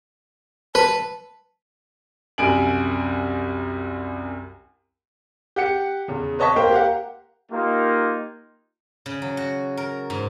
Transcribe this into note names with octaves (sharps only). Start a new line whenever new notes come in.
B4 A5
C2 F#2 G#5 D7 F#7
G4 F#5 C#7
E2 C#3
B4 C#5 D#5 A5 C#6 B6
A#3 A#4 C5 F5 G5
G4 A#4 F5 F#5
A#3 D#4 F4 G4 A#4
C#3
F#3
F#4
A#4
G#2